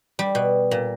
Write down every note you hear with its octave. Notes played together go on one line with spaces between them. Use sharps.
G3
B2
A#2